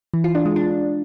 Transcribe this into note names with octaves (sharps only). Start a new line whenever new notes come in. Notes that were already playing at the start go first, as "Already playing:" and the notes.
E3
F4
D4
G#3
D4